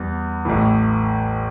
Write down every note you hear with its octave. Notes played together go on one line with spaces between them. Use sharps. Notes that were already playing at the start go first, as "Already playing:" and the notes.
Already playing: E2 G3 B3
A1 A2 E3